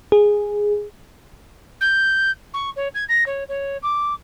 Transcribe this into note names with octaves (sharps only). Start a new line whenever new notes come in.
G#4
G6
C#6
C#5
G#6
A#6
C#5
C#5
D6